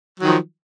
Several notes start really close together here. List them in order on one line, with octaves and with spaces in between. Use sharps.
F#3 D#3 F3